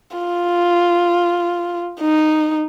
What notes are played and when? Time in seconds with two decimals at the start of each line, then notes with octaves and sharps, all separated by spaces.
0.17 F4
2.00 D#4